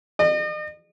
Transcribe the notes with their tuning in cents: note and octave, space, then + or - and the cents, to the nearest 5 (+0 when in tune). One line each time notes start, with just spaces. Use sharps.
D#5 -40